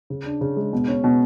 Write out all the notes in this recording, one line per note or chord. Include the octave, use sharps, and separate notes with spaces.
C#3
D4
C#3
G#3
B2
C#4
B2